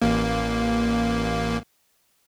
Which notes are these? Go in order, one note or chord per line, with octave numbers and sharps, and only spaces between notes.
A1 A#3